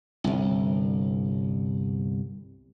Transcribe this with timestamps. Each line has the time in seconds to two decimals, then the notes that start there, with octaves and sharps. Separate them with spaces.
0.24 G1 C2